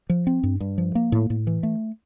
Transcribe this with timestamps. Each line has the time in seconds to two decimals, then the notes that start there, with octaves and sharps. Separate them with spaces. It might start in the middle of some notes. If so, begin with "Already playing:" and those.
0.09 F3
0.27 C4
0.43 G2
0.60 G2
0.78 F3
0.95 A#3
1.12 A2
1.30 A2
1.47 E3
1.63 A3